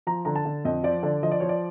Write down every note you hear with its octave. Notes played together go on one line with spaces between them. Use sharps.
F3 A#5
D3 A#5
A5
D3
F2 D#5
F3 D5
D3 D5
F3 D#5
D5
F3 C#5
D5